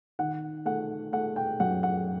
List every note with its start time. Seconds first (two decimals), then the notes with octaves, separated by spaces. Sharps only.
0.19 D#3 F#5
0.65 A3 F#5
1.12 A3 F#5
1.36 G5
1.60 F#2 F#5
1.83 F#5